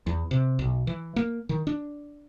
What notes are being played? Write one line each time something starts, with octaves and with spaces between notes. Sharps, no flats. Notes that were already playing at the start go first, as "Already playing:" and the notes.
E2
C3
B1
E3
A#3
D#3
D4